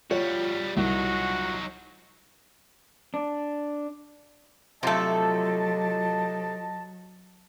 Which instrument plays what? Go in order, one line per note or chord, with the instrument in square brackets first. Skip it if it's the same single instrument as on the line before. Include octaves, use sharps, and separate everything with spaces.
[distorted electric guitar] G3 F#4 [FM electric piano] F4 [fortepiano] C#5
[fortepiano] C2 [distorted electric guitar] F#3 D#4 [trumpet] F#4
[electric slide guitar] D4
[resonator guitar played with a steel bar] C3 A3 [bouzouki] F3 A4 [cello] F#3 [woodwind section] D#5 A5